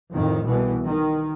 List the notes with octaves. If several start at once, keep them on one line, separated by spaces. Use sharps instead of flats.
F2 A2 D#3
C2 B2 E3
D#3